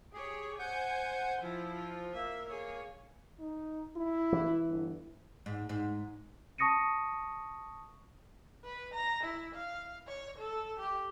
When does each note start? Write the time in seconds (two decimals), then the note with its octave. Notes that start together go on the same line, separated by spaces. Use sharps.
0.13 G4 G#4 C#5
0.59 C5 F#5 G#5 G6
1.42 F3 E4 F4
1.75 F4
2.13 A#3 E5
2.50 G#4 C#5
3.40 D#4
3.96 E4
4.32 E3
4.66 G1
5.46 G#2
5.69 G#2
6.58 A5 C#6 D#6 A#6 C#7 D#7
8.64 B4
8.94 A#5
9.23 E4
9.55 F5
10.08 C#5
10.38 A4
10.80 G4